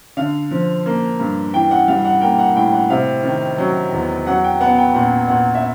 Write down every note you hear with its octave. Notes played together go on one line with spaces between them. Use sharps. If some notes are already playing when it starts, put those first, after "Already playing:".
D3 F5
F3
A#3
G2
E3 G5
F#5
G3 F5
F#5
A#3 G5
F#5
A2 G5
F#5
C3 F5
D#3
F#3
E2
F#3 F#5
G5
B3 F#5
G5
A#2 F#5
A#2 F#5
E5